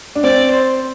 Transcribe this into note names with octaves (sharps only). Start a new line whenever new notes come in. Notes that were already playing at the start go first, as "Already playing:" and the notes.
D4
C4 D5
C5